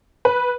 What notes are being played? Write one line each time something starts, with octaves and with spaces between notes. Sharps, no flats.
B4